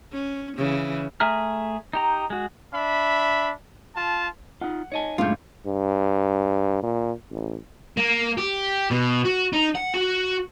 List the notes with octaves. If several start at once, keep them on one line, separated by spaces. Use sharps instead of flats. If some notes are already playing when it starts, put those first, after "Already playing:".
C#4
C#3 E3
A3 G#4 E5 A#5 F6
D#4 G4 A#5
G#3 F#4
D4 E5 B5
F4 A5
D#4 F4 F#5
D#4 C#5 D#5 G#5 A5
F#1 A2 G#3 D4 F4 G6
G2
A#2
A1
A#3
G4
B2
F#4
D#4
F#5
F#4